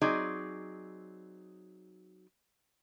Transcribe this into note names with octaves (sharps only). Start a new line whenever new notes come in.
F#3 C4 D#4 G#4 D5